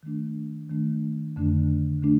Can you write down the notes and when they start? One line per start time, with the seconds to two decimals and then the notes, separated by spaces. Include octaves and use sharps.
0.03 D#3 A3 D4
0.70 D#3 A3 D4
1.36 F2 D3 A3 D4
2.03 D3 A3 D4